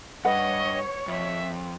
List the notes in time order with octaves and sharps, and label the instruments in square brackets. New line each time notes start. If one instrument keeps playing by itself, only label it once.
[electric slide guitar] G2 [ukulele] B4 F#5 [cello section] C#5 [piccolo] D#5
[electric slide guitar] F2 [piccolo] E5